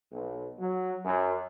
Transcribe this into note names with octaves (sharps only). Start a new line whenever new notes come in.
B1
F#3
F#2